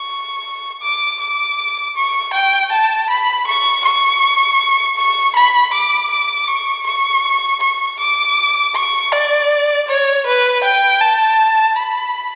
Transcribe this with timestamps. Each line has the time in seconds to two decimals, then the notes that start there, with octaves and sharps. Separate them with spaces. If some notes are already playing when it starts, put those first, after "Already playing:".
Already playing: C#6
0.82 D6
1.20 D6
1.96 C#6
2.33 G5
2.72 A5
3.09 B5
3.47 C#6
3.85 C#6
4.97 C#6
5.36 B5
5.73 D6
6.11 D6
6.48 C#6
6.87 C#6
7.61 C#6
7.99 D6
8.75 C#6
9.12 D5
9.88 C#5
10.26 B4
10.64 G5
11.01 A5
11.76 B5